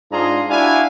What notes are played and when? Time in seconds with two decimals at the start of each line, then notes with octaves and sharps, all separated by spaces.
0.12 G#2 D4 F4 G#4 A#5 C6
0.50 D4 E4 F#4 F5 G#5